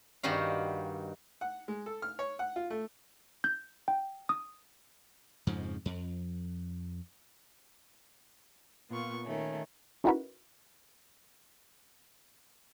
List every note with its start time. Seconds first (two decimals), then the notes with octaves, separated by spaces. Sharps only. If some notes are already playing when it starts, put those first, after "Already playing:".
0.23 G2 D#3 G3 F#4 F5
1.41 F#5
1.68 G#3
1.86 A4
2.02 F6
2.19 C#5
2.39 F#5
2.56 F4
2.70 A3
3.44 G6
3.88 G5
4.29 D#6
5.47 F2 G#2 C#3 F3
5.85 F2
8.90 A#2 B3 F4 C#6
9.25 D#3 A3 C#4
10.04 C#4 D#4 E4 F#4 A#4 B4